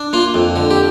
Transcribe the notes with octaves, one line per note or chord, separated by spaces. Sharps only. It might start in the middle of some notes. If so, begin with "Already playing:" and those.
Already playing: D4
A#3 F4
F2
D3
G4